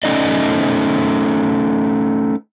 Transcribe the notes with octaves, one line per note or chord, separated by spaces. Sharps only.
A3 C#4 D#4 D5 D#5